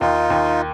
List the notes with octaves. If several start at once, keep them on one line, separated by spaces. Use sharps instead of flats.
D#2 D#4 F4
D#2